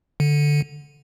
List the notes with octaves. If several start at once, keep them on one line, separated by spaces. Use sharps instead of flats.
D3